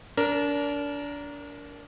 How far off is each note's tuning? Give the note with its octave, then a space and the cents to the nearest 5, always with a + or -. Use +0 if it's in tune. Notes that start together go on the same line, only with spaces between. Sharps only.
D4 -30 A#4 +0